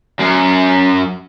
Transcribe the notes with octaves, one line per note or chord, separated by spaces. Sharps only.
F#2